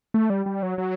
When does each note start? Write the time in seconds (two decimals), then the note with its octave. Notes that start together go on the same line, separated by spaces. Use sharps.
0.14 A3
0.30 G3
0.46 G3
0.63 F#3
0.78 F#3